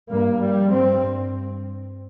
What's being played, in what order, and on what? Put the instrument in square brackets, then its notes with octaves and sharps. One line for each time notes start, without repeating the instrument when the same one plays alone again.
[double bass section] G2 A#3
G3
G2 C4